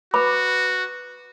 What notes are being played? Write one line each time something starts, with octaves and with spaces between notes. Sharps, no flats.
F#4 B4 B5 D6